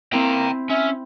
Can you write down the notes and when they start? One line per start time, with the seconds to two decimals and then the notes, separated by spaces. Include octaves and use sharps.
0.13 A#3 C4 E4 G5 A#5
0.70 C#4 E5